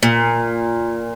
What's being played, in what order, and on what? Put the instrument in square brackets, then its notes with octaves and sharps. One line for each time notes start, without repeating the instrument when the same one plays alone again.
[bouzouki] A#2